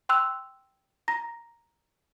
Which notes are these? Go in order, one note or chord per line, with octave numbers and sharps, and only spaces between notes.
G5 C6 E6 F#6 F7
A#5 A#6